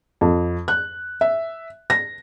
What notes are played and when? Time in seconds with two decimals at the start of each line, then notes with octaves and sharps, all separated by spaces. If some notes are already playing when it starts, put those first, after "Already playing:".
0.21 F2
0.68 F#6
1.21 E5
1.90 A#6